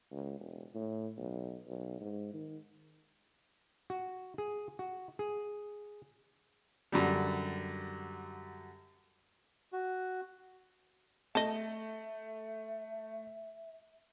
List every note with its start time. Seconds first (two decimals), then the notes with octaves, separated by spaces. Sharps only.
0.11 C#2
0.40 E1
0.74 A2
1.17 B1
1.67 B1
2.01 G#2
2.34 D#3
3.90 F#4
4.38 G#4
4.79 F#4
5.19 G#4
6.92 F#2 D3 G3
9.72 F#4
11.35 A3 D#5 E5 A5